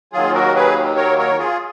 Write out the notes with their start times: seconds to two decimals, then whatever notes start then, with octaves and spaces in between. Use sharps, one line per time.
0.13 D#2 D#3 F#3 F4 G#4
0.34 F#4 A#4
0.55 G#4 B4
0.96 A#4 C#5
1.18 A#4 C#5
1.38 F4 G#4